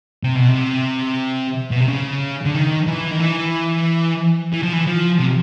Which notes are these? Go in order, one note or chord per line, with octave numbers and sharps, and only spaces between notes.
C3
B2
C3
B2
C3
C#3
D3
D#3
E3
D#3
E3
E3
F3
E3
F3
C3